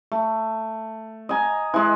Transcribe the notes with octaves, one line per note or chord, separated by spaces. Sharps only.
A3
D#5 G#5 A#5
E3 G#3